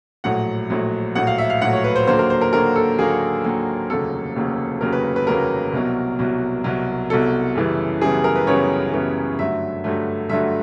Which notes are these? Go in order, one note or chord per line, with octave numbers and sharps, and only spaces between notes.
A#1 A2 F#3 F#5
A#1 A2 F#3
A#1 A2 F#3 F#5
F5
E5
F5
A#1 A2 F#3 F#5
C#5
B4
C5
D#2 D3 F#3 A#3 C5
A#4
C5
A#4
D#2 D3 F#3 A#3 A#4
A4
D#2 D3 F#3 A#3 G#4
D#2 D3 F#3 A#3
F1 D#2 C#3 F#3 A#3 A4
F1 D#2 C#3 F#3 A#3
F1 D#2 C#3 F#3 A#3 A#4
B4
B4
F1 D#2 C#3 F#3 A#3 A#4
C2 B2 F#3
C2 B2 F#3
C2 B2 F#3
C2 B2 F#3 A4
F#2 C#3 E3 G3 B3
F#2 C#3 E3 G3 B3 G#4
A#4
B4
F#2 C#3 E3 G3 B3 C#5
F#2 C#3 E3 G3 B3
G2 D3 F#3 A3 E5
G2 D3 F#3 A3
G2 D3 F#3 A3 E5